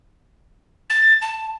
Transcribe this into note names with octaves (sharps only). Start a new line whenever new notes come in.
A6
A5